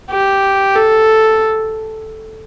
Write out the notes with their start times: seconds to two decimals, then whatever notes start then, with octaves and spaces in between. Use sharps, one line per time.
0.10 G4
0.76 A4